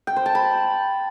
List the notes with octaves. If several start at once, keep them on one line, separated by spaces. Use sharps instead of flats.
G5
C5
A5
B5